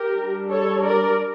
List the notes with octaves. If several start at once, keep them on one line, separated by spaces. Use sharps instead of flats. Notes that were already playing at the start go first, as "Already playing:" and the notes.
Already playing: G4 A#4
G3 D4
A4 C#5
A#4 D5